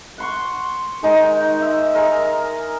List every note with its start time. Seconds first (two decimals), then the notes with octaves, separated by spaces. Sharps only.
0.18 F#5 C6 C#6
1.02 D#3 G#3 D#4 D#5
1.62 E5
1.93 G#4 A#4 D#5